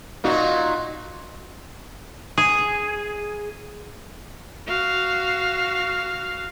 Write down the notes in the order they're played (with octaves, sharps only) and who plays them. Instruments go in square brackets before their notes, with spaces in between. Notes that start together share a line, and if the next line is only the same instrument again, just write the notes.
[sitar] A#2 D#4 F#4
[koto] G#4
[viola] F#4 F5